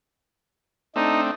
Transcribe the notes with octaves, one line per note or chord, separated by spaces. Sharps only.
A3 C4 D4 D#4